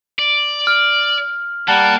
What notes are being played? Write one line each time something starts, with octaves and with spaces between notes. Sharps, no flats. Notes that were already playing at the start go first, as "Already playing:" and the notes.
D5
F6
G3 A#3 F#5 A5